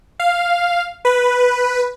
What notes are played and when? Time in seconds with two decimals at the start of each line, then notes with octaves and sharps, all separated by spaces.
0.20 F5
1.05 B4